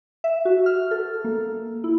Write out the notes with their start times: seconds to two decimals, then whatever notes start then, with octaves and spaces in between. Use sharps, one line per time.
0.24 E5
0.45 F#4
0.66 F6
0.91 A4
1.24 A#3
1.84 E4